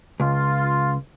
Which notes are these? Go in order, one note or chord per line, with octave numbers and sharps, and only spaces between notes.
C#2 F4